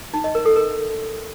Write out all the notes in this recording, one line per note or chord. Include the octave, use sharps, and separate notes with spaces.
D#4
D#5
A#4
A4
A#4